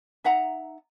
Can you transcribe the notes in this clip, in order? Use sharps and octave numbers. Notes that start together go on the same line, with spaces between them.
D#4 E5 F#5 A#5